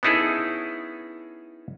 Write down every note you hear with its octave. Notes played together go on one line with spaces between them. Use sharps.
B3 C#4 D#4 E4 G#4 A4